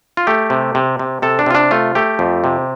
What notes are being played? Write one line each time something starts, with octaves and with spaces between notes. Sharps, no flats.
F4
A3 G4
C3
C3
C3
C3 A4
D4
C3 F4
D4
A3 F4
A3 G4
F2
C3